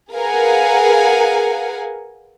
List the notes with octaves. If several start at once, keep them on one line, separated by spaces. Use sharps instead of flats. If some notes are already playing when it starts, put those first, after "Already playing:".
G#4 A#4 B4 F5 F#5 G#5